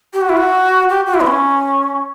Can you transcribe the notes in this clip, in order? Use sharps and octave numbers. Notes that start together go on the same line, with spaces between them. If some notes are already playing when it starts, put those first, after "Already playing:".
G4
F#4
E4
F#4
G4
F#4
E4
B3
C#4